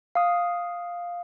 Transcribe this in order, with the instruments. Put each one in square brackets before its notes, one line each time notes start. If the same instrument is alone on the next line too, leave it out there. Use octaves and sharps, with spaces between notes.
[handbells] F5 D#6